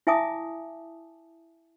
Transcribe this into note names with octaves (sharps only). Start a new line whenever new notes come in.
E4 E5 G#5 A5 D6 D#6